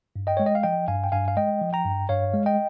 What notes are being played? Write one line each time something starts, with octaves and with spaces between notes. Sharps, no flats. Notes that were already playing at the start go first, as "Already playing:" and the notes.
G2
D#5 G5
G#3 C#5
D#5
F5
F3 D#5 G5
G2 F5 G#5
G5
G2 F5 G#5
F5
G#3 D#5 G5
F3
G5 A#5
G2
G2 C#5 F5
G#3
D#5 G5